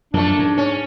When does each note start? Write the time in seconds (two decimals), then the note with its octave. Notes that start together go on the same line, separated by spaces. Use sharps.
0.14 F#2 F3 A3 A#3 D4
0.39 G#2
0.57 C#4